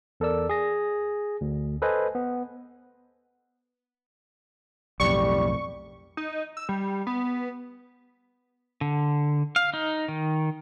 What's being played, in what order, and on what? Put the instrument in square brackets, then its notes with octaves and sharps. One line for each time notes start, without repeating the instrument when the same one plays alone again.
[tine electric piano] E2 A4 A#4 D5 E6
G#4 A#6
D2
A4 B4 C5 D#5 G#5
B3
[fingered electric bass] B1 F2 A2 [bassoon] G3 [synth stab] C#6
[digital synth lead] D#4
E6
G3
B3
[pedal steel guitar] D3
F5
D#4
D#3